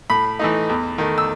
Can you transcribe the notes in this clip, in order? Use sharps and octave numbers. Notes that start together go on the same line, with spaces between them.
A2 B5
E3 A3 D#4
E2
D#3 A3
E6